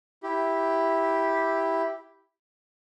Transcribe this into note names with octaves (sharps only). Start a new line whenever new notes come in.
E4 G4